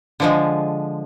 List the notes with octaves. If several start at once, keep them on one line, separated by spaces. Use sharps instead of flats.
D3 F3 G#3